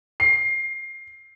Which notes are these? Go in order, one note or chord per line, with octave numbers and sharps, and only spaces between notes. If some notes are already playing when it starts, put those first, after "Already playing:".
C7